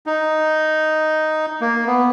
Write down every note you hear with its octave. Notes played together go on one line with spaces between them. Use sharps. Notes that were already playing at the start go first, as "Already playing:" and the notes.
D#4
A#3
B3